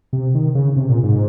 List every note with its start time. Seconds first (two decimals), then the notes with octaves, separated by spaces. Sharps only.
0.13 C3
0.35 D#3
0.55 C#3
0.76 C3
0.89 A#2
1.03 G#2